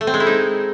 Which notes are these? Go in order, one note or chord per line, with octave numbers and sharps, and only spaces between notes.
A3
C4
G#3
E4
D#4